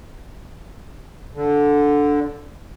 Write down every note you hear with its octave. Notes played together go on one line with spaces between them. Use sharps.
D3